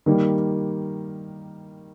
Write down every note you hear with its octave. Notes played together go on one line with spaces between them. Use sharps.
D#3 G3 A#3